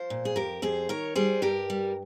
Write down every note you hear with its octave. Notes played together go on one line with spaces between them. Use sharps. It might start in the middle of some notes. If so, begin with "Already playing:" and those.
Already playing: F3 C5
A#2
G#4
F2 G4 A#4
F2 G#4 C5
D#3 A#4 C#5
G3 G#4 C5
G2 G4 A#4
G3